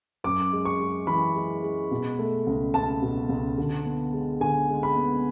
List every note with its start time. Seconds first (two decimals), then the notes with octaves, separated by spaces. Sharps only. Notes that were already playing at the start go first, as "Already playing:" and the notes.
0.24 F#2 D6
0.52 G#3
0.65 C#6
0.80 G#3
1.07 E3 B5
1.35 G#3
1.63 G#3
1.91 B2
2.19 A3
2.47 C#2
2.74 C#2 A5
3.02 B2
3.29 C#2
3.58 D3
3.86 B3
4.13 G#3
4.40 D3 G#5
4.69 G#3
4.83 B5
4.96 B3